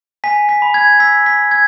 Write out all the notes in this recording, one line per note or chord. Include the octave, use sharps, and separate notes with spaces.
G#5 B6
B6
B5
G#6
E6 B6
B6
E6
G#6